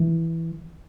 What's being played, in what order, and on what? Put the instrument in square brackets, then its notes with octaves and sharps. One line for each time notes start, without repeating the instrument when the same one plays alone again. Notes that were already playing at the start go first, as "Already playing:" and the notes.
Already playing: [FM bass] E3